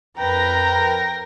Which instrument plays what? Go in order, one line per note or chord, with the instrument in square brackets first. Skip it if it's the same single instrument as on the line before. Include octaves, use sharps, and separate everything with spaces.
[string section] F2 A#4 A#6 [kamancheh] B4 A#5 [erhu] G5